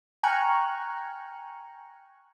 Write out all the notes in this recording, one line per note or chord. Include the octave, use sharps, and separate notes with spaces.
G5 G#5 A#5 C#6 F6 F#6